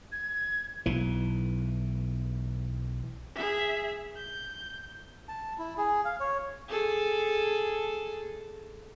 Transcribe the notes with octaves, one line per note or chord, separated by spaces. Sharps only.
G#6
B1 E3
G#4 E5
G6
A5
E4
G#4
F5
C#5
G#4 A4